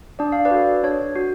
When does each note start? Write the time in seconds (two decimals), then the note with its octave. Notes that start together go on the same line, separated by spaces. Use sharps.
0.19 D4 D5
0.32 F5
0.45 B4 D5
0.51 F#4 A4
0.83 D4 C#5
1.16 F#4